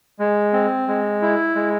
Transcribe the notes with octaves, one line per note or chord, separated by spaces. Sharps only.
G#3
C4
G#3
E4
G#3